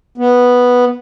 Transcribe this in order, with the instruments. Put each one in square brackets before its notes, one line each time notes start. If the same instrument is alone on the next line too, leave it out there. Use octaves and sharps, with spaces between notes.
[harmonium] B3